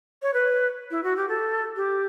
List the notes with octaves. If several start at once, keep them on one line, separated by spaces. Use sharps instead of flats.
C#5
B4
E4
F#4
G4
A4
G4